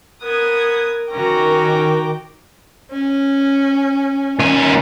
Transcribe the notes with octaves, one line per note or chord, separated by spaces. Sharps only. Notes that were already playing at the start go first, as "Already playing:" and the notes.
B3 A#4 D#6 G#6
D#3 C#4 F#4 G5 A#5 D6
C#4
D#2 C#4 G#5